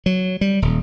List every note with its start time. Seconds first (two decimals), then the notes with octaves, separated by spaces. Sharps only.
0.06 F#3
0.41 G3
0.62 D#1